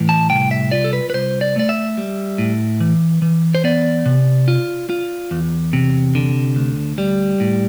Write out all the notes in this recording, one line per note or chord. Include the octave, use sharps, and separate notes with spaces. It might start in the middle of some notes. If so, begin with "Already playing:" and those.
Already playing: A2 E3
A5
C2 G5
E5
F4 D5
A4
B4
B4
C2 C5
D5
A3 D5
E5
G3
A2
E3
E3
C5
B3 D5
C3
F4
F4
E2
C3
D3
D2
G3
A2